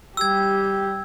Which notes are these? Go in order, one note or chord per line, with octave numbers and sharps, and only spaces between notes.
G3 G4 E6 G#6